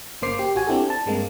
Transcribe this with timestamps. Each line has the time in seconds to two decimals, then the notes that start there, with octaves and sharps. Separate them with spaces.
0.22 G1 C#3 A#3 C5 D6 C7
0.39 G4
0.55 A1 F#4 G4 G#5
0.67 C4 D4 E4 G4 A4
0.90 A5
1.06 G2 G#3 A#3 C4